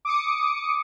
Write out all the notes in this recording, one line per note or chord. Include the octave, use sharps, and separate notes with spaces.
D6 D#6 C#7